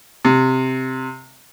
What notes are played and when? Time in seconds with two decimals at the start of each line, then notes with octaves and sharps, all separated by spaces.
0.25 C3